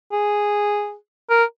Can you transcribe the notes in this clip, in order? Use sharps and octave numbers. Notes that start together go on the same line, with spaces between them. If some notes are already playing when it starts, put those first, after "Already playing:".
G#4
A#4